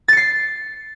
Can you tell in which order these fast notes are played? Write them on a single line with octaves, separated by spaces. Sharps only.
A6 C#7 C7